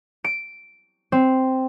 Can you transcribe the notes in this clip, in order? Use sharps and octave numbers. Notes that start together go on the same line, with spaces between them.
D7
C4